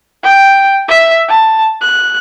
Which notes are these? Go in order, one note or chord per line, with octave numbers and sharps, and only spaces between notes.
G5
E5
A5
F#6